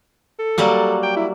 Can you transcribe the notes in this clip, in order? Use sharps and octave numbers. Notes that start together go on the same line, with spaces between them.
A4
F#3 G3 A#3
G5
E4